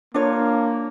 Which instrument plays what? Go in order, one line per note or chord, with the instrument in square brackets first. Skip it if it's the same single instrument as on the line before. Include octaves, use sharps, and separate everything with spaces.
[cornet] A#3 [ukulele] D4 F4 C#5